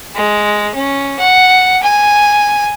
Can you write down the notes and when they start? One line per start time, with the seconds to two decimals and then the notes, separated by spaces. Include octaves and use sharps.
0.15 G#3
0.74 C#4
1.19 F#5
1.83 G#5